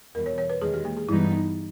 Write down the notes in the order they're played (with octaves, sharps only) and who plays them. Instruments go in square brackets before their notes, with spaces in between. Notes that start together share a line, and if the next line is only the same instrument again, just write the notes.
[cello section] E2 B2 G3 [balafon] A#4
[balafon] C#5
C#5
B4
[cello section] E2 D#3 G#3 [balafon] G#4
[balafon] G4
A#3
G#4
[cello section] G2 E3 G3 B3 D#4 [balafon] E4
[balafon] D#4